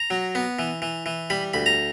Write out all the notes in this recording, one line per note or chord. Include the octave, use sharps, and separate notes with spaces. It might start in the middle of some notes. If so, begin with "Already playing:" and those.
Already playing: A#5
F#3
B3
E3
E3
E3
G3 B5
D2 B5
A#5